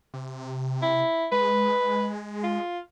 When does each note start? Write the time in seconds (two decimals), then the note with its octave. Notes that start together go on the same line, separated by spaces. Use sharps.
0.14 C3
0.82 E4
1.32 G#3 B4
2.43 F4